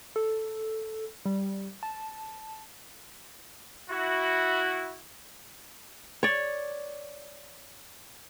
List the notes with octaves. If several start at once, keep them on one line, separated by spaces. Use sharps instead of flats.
A4
G3
A5
E4 F#4
C#5 D5